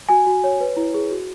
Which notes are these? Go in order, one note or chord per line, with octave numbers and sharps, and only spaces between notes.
F#4 G#5
F#4
C#5
B4
E4
G#4
F#4